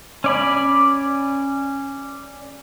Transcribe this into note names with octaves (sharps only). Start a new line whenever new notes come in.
C#4 D5 B5